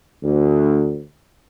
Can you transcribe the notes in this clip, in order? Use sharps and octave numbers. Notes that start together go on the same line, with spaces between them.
D2